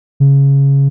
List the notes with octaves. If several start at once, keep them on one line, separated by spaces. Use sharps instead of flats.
C#3